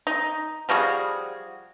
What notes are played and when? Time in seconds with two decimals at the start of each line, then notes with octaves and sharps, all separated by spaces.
0.07 D#4
0.69 F3 G3 F#4 G#4